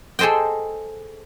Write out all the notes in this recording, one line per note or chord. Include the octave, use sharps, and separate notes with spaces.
G#4 A4 C5 D#5 G5